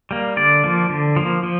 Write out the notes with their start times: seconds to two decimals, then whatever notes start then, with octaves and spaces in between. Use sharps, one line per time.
0.11 G3 A#3
0.37 D3 D5
0.64 F3 A#3
0.90 D3
1.16 F3 A#3
1.43 F3